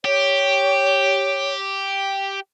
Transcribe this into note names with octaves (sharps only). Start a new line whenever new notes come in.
G4 C#5